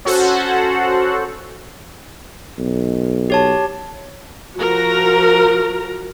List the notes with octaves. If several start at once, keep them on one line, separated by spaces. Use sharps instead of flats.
C#4 F#4 A4 C5 F#5
B1
G4 C#5 A5
F3 F#4 A#4 A#5